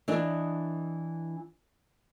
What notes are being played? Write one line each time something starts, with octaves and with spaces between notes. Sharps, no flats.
E3 D4 D#5